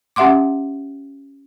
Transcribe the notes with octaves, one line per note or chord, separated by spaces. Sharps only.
C#4 G4 E5 F#5 C6 D6